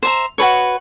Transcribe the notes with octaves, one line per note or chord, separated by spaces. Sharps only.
C5 E5 A#5
F#4 G#4 B4 C#5